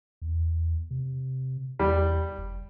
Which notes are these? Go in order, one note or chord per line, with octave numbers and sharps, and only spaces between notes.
E2
C3
E2 G3
F#1